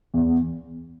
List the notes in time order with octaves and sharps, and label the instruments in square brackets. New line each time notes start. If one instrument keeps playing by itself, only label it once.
[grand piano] E2